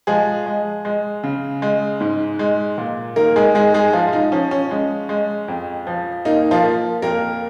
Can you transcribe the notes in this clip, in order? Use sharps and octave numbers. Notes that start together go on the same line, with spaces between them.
F3 G#3 G#4
G#3
G#3
C#3
G#3
G#2
G#3
A#2
D#3 A#3 A#4
G#3 G#4
G#2 G#3 G#4
G#3 G#4
F3 F4
F4
D#4
F3 C#4
C#4
G#3
G#3
F2
F3
A#3 D#4
F3 F4
A#3
F2 A#3 A#4